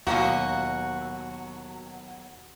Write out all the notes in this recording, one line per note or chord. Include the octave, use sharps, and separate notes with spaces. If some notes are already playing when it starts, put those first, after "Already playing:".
D#2 B2 F#3 A#3 C#4 F4 F#4